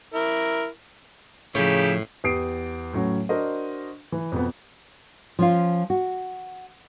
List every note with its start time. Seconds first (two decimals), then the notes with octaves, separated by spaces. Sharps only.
0.14 E4 A#4
1.55 A2 C#3 F3 D#4 E4 G4 C#5 C7
2.24 E2 G4 D#6 C7 D7
2.93 A2 F#3 C#4
3.29 D4 F#4 A#4 C5 D#5
4.12 E3
4.32 F2 B2 B3
5.39 F3 C#4 F4
5.90 F#4